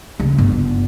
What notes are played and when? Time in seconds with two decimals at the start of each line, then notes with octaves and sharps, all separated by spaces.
0.20 C#3
0.38 G1